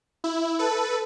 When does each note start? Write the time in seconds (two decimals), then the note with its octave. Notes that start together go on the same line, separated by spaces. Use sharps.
0.24 E4
0.59 A4 B4